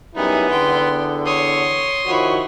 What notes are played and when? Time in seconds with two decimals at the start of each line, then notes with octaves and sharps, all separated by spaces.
0.15 F#2 G3 B3 D#4 E4 G#4
0.51 E2 D3 G5 C6
1.26 C#5 C6 D#6
2.07 D#3 F3 E4 F#4 C#5